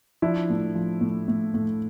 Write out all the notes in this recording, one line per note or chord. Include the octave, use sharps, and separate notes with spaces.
F3 D4 E4
A2
F3
A2
A2
A2